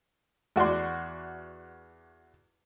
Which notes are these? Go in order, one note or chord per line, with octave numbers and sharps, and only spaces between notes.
E2 F#4 D5 C6